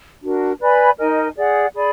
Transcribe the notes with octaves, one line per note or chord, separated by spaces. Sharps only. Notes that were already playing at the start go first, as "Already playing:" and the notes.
D4 F#4 A#4
B4 D5 G#5 B5
D#4 A#4 D#5 G#5
G#4 D5 F#5
G#4 D5 G#5 B5